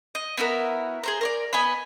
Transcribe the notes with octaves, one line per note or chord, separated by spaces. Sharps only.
D#5
B3 E4 F#4 A#4
G#4 C5 A#5
A#4 C#5 D5
B3 D#5 G#5 B5